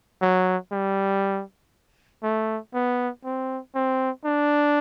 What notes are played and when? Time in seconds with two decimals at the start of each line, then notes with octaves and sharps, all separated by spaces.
0.21 F#3
0.72 G3
2.23 A3
2.74 B3
3.24 C4
3.75 C4
4.25 D4